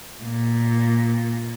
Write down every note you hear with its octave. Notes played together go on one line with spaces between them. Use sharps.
A#2